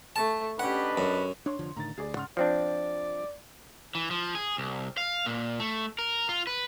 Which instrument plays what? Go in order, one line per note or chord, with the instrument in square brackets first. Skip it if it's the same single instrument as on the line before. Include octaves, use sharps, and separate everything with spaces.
[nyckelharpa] A3 [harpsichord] A5
[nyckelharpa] C#4 G4 [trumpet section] D4 B4 D#5 [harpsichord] F#5
[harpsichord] F#2 [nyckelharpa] F#4
[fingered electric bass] D4 [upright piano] C#5 C6
[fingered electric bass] F1 D3 F3
[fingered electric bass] A2 D3 D#3 [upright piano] A#5 A6
[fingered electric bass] D2 [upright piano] G#4 D5
[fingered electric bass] G#2 C#3 [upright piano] F#5 C6 F6
[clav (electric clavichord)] F3 C4 D4 [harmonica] D5
[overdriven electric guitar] E3
F3
G#4
C2
F5
A#2
A3
A#4
F4
B4